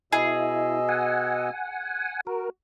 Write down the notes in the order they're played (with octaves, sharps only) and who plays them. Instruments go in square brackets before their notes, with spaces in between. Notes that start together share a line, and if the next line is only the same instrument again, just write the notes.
[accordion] B2 D#5 E6 [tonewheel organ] E4 [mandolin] G#4
[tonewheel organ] F#5 G#5
[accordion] F#4 [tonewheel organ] A#4